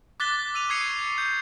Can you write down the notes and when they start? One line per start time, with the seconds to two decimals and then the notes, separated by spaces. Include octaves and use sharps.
0.20 D6 F#6 A6 B6 G7
0.54 E6 D#7 F7
0.69 C#6 D#6 G#6 C7 C#7 F7
1.18 G6